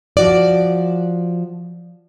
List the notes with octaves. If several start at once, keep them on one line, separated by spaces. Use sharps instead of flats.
F3 F#4 D5